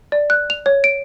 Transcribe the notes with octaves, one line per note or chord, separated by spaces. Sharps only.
D5
F#6
F7
C#5
D7